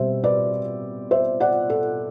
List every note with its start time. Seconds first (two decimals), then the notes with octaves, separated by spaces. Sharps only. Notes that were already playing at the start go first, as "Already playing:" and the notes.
Already playing: B2 G3 C4 C5 E5
0.24 B4 D5
1.11 C5 E5
1.40 D5 F#5
1.70 A4